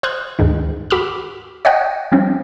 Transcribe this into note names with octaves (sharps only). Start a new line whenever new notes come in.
C5 D#6 F6 F#6 G#6
D2 G#2 D#3
F#4 B5 D6 E6 F6
C#5 D#5 F#5 G5
F3 G3 C4 C#4